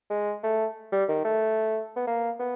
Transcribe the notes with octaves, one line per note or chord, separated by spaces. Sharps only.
G#3
A3
G3
D#3
A3
B3
A#3
B3